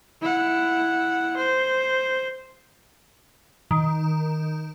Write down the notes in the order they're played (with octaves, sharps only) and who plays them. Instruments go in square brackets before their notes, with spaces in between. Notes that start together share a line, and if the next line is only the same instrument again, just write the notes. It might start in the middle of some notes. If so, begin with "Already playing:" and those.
[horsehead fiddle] E4 F#5
C5
[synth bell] D#3